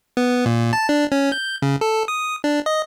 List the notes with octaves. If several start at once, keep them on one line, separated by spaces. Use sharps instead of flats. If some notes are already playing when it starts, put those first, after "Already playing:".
B3
A#2
A5
D4
C#4
G6
C#3
A4
D#6
D4
D#5